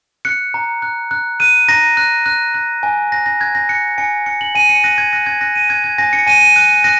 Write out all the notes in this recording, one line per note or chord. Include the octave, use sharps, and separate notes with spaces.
F#6 C#7
A#5
F#6
F#6
F#6 D#7
A#5 A#6
F#6
F#6
F#6
G#5
F#6 A#6
A#6
F#6 G#6
A#6
F#6 C#7
G#5 C#7
F#6 C#7
F#7
G#5 D#7
C#7
F#6 A#6
G#6
F#6 A#6
G#6
F#6 A#6
D#7
F#6 G#6
G#6
G#5 A#6
C#7
G#5 D#7
D#7
F#6
F#6 A#6